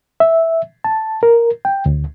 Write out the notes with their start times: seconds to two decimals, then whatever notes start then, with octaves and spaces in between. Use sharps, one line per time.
0.20 E5
0.84 A5
1.23 A#4
1.65 G5
1.86 D2